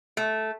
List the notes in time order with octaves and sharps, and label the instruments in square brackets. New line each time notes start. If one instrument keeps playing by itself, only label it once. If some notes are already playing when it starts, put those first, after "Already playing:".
[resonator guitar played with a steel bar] A3